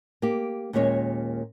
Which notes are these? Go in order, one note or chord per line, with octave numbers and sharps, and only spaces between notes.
A#3 G4
D#2 A#2 G#3 C#4 C#5